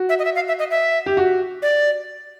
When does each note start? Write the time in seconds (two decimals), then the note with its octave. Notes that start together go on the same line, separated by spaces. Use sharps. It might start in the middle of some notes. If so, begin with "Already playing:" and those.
Already playing: F#4
0.09 E5
0.19 D#5
0.25 E5
0.35 F5
0.48 E5
0.59 D#5
0.71 E5
1.06 G4
1.17 F#4
1.62 D5